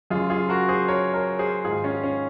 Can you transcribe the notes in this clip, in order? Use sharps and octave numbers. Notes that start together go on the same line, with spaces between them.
F#2 C#3 F4 G#4
F4 G#4
F#4 A#4
G#4 C5
A#4 C#5
A#4 C#5
G#4 C5
G#2 D#3 F4 G#4
C#4 F4
C#4